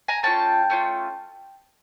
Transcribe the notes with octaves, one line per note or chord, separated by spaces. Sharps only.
G#5 A#5
A3 C#4 F4 G5 A5
A3 C#4 F4